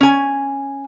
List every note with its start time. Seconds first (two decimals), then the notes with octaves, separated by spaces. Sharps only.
0.01 C#4 G#5